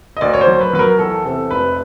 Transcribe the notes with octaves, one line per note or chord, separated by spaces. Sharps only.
D#5
D2 D5
C#5
C5
F#3
B4
F#3 B4
A#4
E2 A4
C3 A4
F1 B4